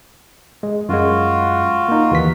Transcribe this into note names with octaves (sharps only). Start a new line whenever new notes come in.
G#3
F#2 G#3 F4 F#4
A#3 D#4
D#2 E3 B6